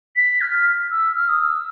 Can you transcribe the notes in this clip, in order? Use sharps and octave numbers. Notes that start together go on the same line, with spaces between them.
B6
F6
E6
F6
D#6
E6